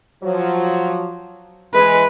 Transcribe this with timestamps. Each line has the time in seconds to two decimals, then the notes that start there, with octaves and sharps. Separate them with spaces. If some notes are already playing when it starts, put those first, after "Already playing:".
0.24 F3 F#3
1.74 E3 G#3 B4